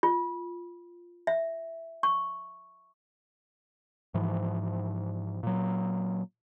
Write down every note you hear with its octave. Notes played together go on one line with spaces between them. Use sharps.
F4
E5
C#6
G#2 E3 F3
A#2 F#3